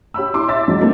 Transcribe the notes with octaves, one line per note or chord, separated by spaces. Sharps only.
G4 C#5 B5 E6
E4 C6 D6
C#5 E5 A6
E2 F3 F#3 G#3
D3 G3 A3 A#3 C4